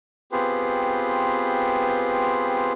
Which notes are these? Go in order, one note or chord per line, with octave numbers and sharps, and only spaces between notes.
B3 C4 F4 G4 G#4 B4